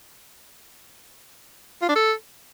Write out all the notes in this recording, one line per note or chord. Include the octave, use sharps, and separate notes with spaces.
F4
D4
A4